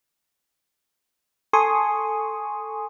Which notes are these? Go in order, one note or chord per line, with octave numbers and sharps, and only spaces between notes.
A4 G#5 C6 C#6 D#6